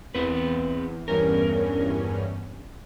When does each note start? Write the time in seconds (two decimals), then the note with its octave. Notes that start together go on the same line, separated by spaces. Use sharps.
0.15 E2 C4 B4
1.08 E2 G2 C#4 A#4